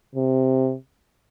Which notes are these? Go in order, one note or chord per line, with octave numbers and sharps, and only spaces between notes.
C3